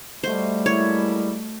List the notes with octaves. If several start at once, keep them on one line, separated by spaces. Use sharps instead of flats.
G3 A3 F#4 C5 D#5
G#3 A#3 E4 C#5